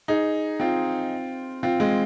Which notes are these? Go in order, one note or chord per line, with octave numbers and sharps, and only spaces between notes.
D#4 G#4
C4 F4
C4 F4
G#3 C4